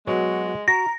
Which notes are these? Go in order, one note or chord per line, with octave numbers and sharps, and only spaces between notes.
F#3 G#3 B3 F#4 C#5
F#4 A#5 A#6